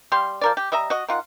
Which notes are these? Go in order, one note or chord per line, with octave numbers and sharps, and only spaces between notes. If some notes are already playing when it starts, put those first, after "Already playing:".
G3 G4 F5 C6
F3 A#4 D5
G4
G3 D#5 E5 A#5
F#4 D#5
D#3 F4 F#5